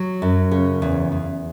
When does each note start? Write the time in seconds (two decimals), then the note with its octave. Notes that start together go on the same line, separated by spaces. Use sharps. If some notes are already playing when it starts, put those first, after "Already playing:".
Already playing: F#3
0.22 F#2
0.51 C#3
0.82 E2
1.12 E2